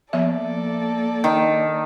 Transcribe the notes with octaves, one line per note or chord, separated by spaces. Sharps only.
F3 A#3 B3 A4 D5 E5
D#3